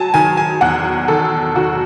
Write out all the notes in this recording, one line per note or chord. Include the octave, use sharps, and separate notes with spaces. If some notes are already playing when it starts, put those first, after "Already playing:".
Already playing: F#3 G#5 A5
D#3 G#5
G#5
E2 F#5
D#3 A4
D#3 F#4